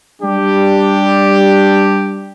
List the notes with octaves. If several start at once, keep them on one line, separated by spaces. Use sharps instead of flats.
G3 D4 G4